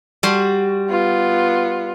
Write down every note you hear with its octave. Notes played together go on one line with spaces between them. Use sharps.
G3 F#4 C6
B3 F4